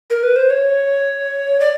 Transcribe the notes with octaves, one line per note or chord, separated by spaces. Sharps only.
A#4
B4
C5
C#5
D5